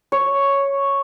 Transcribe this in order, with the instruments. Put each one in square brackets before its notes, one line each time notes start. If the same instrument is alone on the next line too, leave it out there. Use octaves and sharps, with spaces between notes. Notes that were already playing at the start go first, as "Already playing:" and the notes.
[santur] C#5